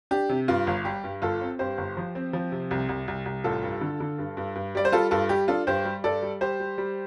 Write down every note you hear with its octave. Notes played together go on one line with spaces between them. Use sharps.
D4 G4
C3
G2 F4
G1
G3 G4
G2
G1 F4 A4
C4
G2 G4 C5
G1
F3
C4
F3
C3
C2
C2
C2
C2
A1 F4 A4
G2
D3
D3
G2
G2
G2
G3 D5
C5
G3 F4 A4
G2 F4 A4
G3 G4
D4 F4 A4
G2 G4 C5
G3
G2 A4 D5
G3
G3 G4 C5
G3
G3